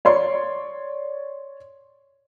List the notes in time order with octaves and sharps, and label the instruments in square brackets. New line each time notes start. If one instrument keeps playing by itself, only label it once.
[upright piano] C#5 D5 C6